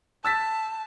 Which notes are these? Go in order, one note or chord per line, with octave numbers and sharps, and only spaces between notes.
A5 E6 A6 B6